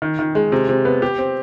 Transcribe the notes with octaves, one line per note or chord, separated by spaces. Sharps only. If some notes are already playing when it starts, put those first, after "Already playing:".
D#3
D#3
G#3
C3
C3
B3
G4
C4